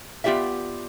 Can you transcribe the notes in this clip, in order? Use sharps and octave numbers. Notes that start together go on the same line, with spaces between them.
B3 F4 G4 D5 E5